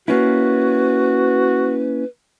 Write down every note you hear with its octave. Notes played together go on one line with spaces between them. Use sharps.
A#3 C#4 E4 F#4 B4